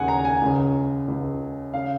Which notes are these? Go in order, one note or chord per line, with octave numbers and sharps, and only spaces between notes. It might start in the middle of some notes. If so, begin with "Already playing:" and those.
Already playing: D#2 C#3 F#5 G#5
A#5
G#5
C#2 C#3
C#2 C#3
C#3 F5